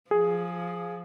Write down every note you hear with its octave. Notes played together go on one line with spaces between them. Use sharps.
F3 G#4